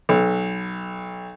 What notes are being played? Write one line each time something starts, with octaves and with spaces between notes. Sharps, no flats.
B1